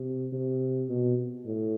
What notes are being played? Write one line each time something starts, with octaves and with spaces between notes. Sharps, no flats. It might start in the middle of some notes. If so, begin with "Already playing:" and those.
Already playing: C3
C3
B2
A2